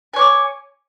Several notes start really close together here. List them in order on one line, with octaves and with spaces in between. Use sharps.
G#5 C#5 D6